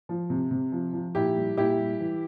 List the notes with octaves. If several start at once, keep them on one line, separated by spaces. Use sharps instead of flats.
F3
C3
C3
F3
F3
A#2 E4 G4
G3
A#2 E4 G4
G3
E3